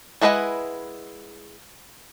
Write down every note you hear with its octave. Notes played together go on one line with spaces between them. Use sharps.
G#3 E4 B4 D#5 F#5